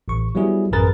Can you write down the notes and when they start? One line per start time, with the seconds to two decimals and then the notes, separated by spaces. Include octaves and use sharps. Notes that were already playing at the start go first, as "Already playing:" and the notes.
0.08 A1 C#6
0.35 F#3 G3 B3 E4 G#4
0.72 A1 F#2 G#4 A#4 B4 A6